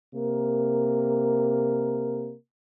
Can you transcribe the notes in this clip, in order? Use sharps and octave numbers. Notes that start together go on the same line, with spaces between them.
C3 A#3 A#4